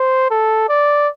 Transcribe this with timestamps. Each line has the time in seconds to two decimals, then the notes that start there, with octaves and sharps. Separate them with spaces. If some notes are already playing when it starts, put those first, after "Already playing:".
Already playing: C5
0.31 A4
0.69 D5